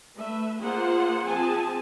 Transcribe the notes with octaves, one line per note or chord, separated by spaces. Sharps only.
A3 B4 E5
A#3 F4 G#4 C5 F#5
F3 C4 G#4 G#5 A5